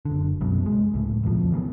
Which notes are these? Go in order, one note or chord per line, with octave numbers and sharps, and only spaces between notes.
F#1 D3
C2 F#2 B2
G#3
C#2 A2
E1 A#1 F2 F3
C#3 E3 A#3 B3